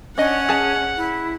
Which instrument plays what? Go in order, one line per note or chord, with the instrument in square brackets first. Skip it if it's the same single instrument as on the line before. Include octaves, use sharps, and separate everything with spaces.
[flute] C#4 [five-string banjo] D4 D#5 [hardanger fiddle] F#5
[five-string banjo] G#4 A5
[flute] E4